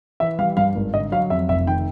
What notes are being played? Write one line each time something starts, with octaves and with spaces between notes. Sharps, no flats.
E3 E5
G3 F5
G2 F5
G#1
D3 D#5
F#3 F5
F2 E5
F1 E5
D#3 G5